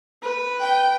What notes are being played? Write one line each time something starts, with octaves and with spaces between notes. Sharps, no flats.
B4
G5